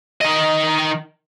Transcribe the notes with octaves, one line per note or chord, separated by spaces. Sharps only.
D#3 D#5